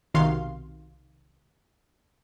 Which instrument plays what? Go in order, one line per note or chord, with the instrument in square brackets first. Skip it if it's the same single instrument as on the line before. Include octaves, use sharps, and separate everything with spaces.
[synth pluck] B1 C3 D#3 F#4 F5 C6